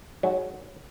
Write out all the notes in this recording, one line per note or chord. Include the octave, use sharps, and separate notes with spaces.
G#2 F#3